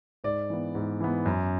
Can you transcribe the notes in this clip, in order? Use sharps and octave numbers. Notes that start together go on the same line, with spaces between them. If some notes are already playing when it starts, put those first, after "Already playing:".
G#2 D5
E3 B3
G#2
E3 B3
F#2